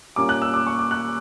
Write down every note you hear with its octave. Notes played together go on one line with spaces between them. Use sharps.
A#2 G3 A#3 C#4 D6
F#6
E6
D6
C#6
D6
F#6